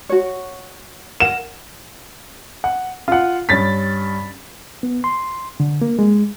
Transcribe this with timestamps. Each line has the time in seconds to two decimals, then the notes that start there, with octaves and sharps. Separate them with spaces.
0.09 F#4 C#5
1.20 A#4 F#5 E7
2.64 F#5
3.08 F4 F#5
3.49 G2 C#4 A6 B6
4.83 B3
5.04 C6
5.60 D3
5.82 A#3
5.99 G#3